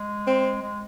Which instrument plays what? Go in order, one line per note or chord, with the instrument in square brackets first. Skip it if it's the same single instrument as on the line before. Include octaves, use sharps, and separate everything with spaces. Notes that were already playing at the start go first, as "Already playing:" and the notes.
Already playing: [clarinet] G#3
[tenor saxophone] C4
[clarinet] G#3